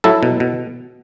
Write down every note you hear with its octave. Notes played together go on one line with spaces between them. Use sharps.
F#3 E4 A4
B2
B2